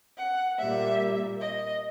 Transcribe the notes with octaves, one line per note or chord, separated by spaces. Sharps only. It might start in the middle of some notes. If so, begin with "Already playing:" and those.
F#5
A#2 G3 A#3 E5
D#5